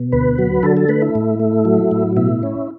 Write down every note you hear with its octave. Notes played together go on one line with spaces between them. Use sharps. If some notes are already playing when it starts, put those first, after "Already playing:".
Already playing: B2
D2 B4
F#3
D3 A4
A4
A3 B4
E4
A2
A3
F#3
A2
B2 E4
C#4